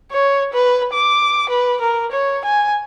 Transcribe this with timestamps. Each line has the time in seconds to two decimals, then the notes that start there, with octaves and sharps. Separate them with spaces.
0.11 C#5
0.53 B4
0.93 D6
1.50 B4
1.81 A#4
2.12 C#5
2.45 G#5